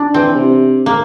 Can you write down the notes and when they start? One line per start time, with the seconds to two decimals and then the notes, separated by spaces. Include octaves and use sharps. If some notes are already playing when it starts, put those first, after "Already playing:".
Already playing: D4
0.14 E3 C4
0.35 C3
0.86 A#3